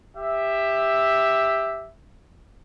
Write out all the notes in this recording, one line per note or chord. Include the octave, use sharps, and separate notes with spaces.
G4 E5